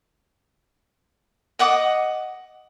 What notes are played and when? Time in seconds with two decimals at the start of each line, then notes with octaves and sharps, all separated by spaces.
1.59 D#5 F#5 D6 D#6